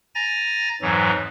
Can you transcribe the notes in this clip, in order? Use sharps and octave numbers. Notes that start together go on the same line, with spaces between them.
G#5 A#5 A6 A#6
F2 G#2 E3 F#3